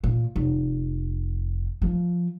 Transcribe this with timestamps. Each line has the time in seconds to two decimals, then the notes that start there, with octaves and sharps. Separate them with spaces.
0.04 A#2
0.36 F1
1.82 F3